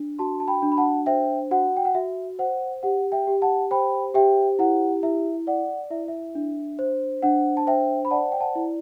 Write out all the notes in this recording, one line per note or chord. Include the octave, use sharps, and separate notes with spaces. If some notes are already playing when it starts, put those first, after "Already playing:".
Already playing: D4
F#4 A5 C6
A5
G5 B5
D4
B5
F#5 A5
C5 E5 G5
F#4 F#5
G5
F#5
F#4 E5
C5 F#5
G4 F#5
E5 G5
G4
F#5 A5
C5 G5 B5
G4 E5 G5
E4 F#5
E4 E5
D5 F#5
E4 E5
E5
D4
C5
D4 F#5
A5
C5 E5 G5
B5
D5 F#5 A5
G5
F#5 A5
E4